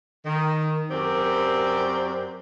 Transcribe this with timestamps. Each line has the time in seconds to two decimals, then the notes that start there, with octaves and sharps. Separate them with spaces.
0.26 D#3
0.91 F#2 F#3 C4 G4 A#4 D5